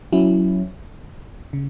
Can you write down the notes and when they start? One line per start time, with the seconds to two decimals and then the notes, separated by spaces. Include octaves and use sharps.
0.13 F#3 C#4 E4
1.53 C#3